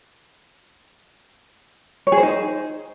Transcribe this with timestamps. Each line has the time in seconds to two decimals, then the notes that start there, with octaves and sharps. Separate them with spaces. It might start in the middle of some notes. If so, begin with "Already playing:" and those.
2.07 C#5
2.12 G#4
2.17 C5
2.23 D#4